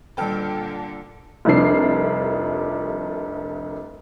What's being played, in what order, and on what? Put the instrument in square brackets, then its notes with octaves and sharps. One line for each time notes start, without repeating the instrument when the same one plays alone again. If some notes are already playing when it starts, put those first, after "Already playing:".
[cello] A#2 D3 [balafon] D#3 G3 [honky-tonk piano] A4 G5 F6
[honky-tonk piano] F1 C2 F3 D4 C7